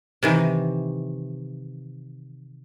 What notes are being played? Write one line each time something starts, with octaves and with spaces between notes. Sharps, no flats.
C3 D#3 E3